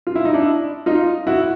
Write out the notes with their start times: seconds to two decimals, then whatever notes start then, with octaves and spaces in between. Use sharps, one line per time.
0.07 F4
0.16 E4
0.25 D#4
0.34 D4 E4
0.86 D#4 F4
1.27 E4 F#4